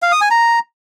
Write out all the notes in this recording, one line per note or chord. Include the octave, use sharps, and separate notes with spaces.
F5
D#6
G#5
A#5